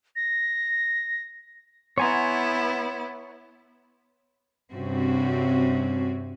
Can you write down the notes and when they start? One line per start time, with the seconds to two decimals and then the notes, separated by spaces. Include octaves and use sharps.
0.16 A#6
1.98 B3 E4 C#5 F#5 G#5 A#5 C6 G#6
4.71 G2 C3 C4 C#4 F#4